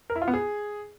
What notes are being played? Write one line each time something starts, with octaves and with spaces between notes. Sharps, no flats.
A#4
E4
F4
B3
G#4